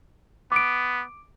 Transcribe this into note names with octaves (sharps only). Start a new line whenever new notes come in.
B3 D6 D7